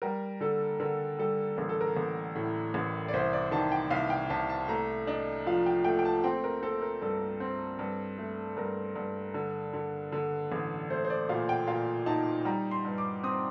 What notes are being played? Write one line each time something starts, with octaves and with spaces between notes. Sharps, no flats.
G3 A#4
D3 A4
D3 A#4
G3 A4
A1 A#4
A4
A#4
A1
A2
A1
D5
C2 C5
D5
D#3 A5
G5
C2 F5
G5
C2 A5
A5
A3 A#5
D4 D#5
F3 F5
G5
A3 G5
G5
A5
C4 G5
A#4
C4 A4
A#4
G2 A4
C4
G2
A3
G2 A#4
G2
D3
D3
D3
A1
A3 C5
C5
D5
A#2 F5
G5
A#2 F5
D#4 A5
G3 A#5
C6
G2
D6
C4 D#6